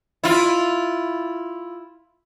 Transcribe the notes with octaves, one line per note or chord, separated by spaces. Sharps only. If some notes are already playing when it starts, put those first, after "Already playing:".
E4 F4